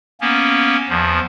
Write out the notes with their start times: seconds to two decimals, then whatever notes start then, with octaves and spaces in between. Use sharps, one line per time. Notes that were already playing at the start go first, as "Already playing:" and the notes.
0.21 A#3 B3 C#4
0.89 E2 F3